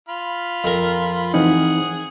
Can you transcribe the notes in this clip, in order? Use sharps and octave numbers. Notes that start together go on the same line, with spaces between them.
F4 B5 F6
F2 A#4
E3 C4 D#4 G#4 F#5